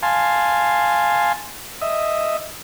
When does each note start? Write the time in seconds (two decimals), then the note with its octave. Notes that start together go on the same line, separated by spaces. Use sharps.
0.03 F5 G#5 A5 C6
1.81 D#5 E5